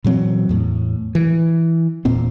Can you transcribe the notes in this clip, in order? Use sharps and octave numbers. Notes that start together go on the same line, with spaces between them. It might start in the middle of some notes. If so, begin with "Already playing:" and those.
A#2 E3 F#3 C4
E2 A2
E3
E1 A#2 C4